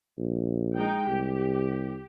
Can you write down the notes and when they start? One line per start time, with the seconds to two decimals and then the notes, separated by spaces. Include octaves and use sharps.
0.18 A#1
0.76 G#3 D#4 G5
1.08 C2 G4